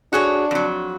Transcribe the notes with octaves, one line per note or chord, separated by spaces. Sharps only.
D4 F#4 G#4 C#5
F2 F#3